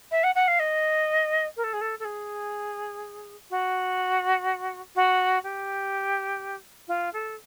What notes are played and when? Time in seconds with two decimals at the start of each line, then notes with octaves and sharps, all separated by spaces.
0.11 E5
0.23 F#5
0.35 F#5
0.47 F5
0.59 D#5
1.56 A#4
1.64 A4
1.73 G#4
1.81 A4
1.99 A4
2.04 G#4
3.50 F#4
4.95 F#4
5.43 G4
6.88 F4
7.13 A4